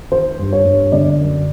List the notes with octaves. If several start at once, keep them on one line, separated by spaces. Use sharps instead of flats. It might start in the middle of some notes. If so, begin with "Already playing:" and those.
D#3 C5
G2
C#5
G2
D3 D5
F#2